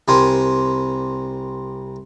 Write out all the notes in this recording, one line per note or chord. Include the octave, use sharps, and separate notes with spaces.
C2 G3 C4 A#4 C5 G#5